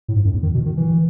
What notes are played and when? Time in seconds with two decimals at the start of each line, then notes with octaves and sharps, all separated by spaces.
0.08 A2
0.16 G#2
0.25 F#2
0.34 E2
0.43 D#3
0.54 B2
0.66 D#3
0.77 E3